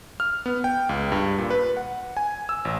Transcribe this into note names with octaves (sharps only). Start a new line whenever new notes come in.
F6
B3
G5
C#2
G2
A#2
B4
F#5
G#5
E6
A1